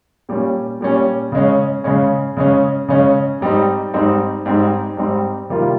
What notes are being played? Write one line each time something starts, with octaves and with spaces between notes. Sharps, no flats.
A#2 G3 C#4
A#2 G3 C#4
C#3 G#3 C#4
C#3 G#3 C#4
C#3 G#3 C#4
C#3 G#3 C#4
G#2 G3 C4 D#4
G#2 G3 C4 D#4
G#2 G3 C4 D#4
G#2 G3 C4 D#4
C3 D#3 G3 A#3 F4